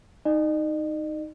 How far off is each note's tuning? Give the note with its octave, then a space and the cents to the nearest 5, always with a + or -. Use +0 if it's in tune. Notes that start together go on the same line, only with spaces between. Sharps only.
D#4 +0 D#5 -45